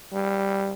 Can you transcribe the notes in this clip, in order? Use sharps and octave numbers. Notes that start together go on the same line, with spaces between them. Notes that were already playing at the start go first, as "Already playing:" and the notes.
G3